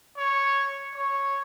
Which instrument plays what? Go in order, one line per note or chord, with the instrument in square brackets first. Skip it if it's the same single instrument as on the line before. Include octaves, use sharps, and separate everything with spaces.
[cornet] C#5
C#5